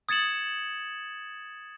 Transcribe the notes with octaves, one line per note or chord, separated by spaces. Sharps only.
D#6 G#6 A6 C#7 E7 F#7